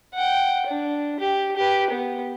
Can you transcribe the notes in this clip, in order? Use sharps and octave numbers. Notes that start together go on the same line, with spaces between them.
F#5 G5
D4
G4
G4 B4
B3